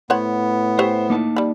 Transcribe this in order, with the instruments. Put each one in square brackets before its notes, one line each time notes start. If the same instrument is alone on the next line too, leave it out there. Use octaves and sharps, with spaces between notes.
[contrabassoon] A2 [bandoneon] B3 [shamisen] C5 C#5 F#5
[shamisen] G4 C#5 E5 [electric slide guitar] C5
[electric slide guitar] A#3 D#4 A5
[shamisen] G3 B5